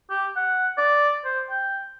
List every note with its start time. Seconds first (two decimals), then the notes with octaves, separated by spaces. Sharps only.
0.10 G4
0.36 F#5
0.78 D5
1.25 C5
1.50 G5